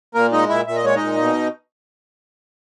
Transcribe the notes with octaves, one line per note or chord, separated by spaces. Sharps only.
A#2 A#3 A#4
G#3 D#4 D#5
A#2 E4 E5
A#2 E5
D#5
G#3 C#5
A#2 D#4 D#5
B2